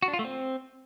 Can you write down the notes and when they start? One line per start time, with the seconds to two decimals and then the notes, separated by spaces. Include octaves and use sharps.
0.02 F#4
0.08 D4
0.13 F4
0.19 A3
0.25 C4